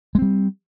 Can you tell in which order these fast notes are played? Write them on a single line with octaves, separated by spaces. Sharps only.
G#3 C4 G3